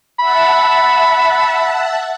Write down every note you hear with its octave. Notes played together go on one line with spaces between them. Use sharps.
E5 F#5 A5 B5